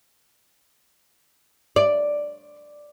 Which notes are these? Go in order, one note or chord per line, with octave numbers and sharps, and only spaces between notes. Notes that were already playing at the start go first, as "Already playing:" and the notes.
D5